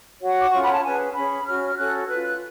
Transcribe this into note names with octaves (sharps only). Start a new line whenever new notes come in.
F#4 C#5 F#5
D6
C#4 F4 A4 C#5 C#6
B5
A5
C#4 G#4 B4 G#5
C#4 G#4 C#5 B5
C#4 F#4 C#5 F6
C#4 F#4 A4 C#5 F#6
F4 B4 F#6
F#6